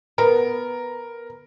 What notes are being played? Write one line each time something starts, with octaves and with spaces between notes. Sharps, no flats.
B3 A#4